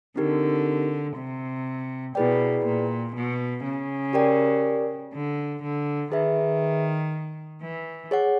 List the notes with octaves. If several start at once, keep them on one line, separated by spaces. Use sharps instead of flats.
D3 C4 D#4 G4 A#4
C3
B2 E4 G#4 B4 D5 G5
A#2
B2
C#3
G4 A#4 D5 G5
D3
D3
D#3 G#4 B4 E5
E3
G#4 C#5 F#5